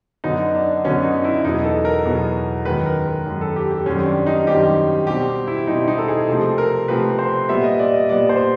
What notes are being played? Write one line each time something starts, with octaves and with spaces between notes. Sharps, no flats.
F#2 D3 F#3 B3 D#4
D4
F#2 D3 F#3 B3 C#4
D#4
E4
E2 B2 F#3 B3 D#4
A4
A#4
E2 B2 F#3 B3
F#2 D#3 G#3 B4
A#4
A#4
F#2 D#3 G#3
A4
G4
G4
F#2 D#3 G3 C4 C#4
D4
D#4
F#2 D#3 G3 C4 G4
B2 G3 C4 G4
E4
B2 G3 C4 D#4
D#4
A4
G#4
C3 F3 A3 C4 A4
A#4
C3 F3 A3 C4 B4
C5
A#2 G3 B3 E5
D#5
D5
D#5
A#2 G3 B3 D5
C5